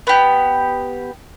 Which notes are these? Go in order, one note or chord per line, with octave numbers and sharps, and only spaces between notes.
B3 G4